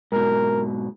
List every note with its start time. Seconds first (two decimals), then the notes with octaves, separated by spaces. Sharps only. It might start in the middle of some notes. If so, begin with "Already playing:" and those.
0.12 G#2 B2 A#4